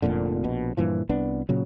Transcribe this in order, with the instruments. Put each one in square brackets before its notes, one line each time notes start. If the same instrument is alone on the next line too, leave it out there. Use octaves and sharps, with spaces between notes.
[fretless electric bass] F1 F2 A#2 D3
A#1 B2
G2 A#2 E3 F3
C2 B3 D4
A#2 C#3 F#3